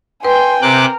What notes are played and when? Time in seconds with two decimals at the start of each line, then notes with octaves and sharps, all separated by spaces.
0.25 B4 G5 G#5 C6
0.62 C3 A#4 D6 F#6